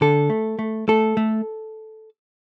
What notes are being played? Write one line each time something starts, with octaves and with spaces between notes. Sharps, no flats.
D3 A4
A3
A3
A3 A4
A3